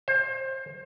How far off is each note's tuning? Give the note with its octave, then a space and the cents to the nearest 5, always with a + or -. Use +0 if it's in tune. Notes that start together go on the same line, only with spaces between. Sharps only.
C5 +25